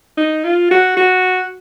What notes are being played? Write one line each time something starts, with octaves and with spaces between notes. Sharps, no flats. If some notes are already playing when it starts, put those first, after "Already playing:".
D#4
F4
F#4
F#4